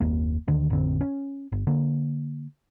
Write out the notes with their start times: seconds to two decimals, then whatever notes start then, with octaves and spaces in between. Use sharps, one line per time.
0.01 F#1 D#2 A#3
0.48 D2 D3 D#3
0.70 A1 F2 D3 C4
1.01 C#4
1.52 G1
1.67 D3 A#3